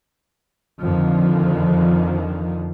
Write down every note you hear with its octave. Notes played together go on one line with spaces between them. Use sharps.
F2 D3 D#3 F3